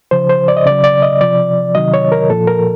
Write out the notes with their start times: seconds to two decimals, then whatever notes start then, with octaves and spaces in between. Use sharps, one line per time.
0.11 C#3 F3 C5
0.29 C5
0.48 D5
0.57 D#5
0.66 C#3 F#3 D5
0.84 D5
1.02 D#5
1.21 C3 F3 D5
1.75 C3 D#3 F#3 D#5
1.94 C#5
2.12 A#4
2.30 A#2 F3 A4
2.47 A#4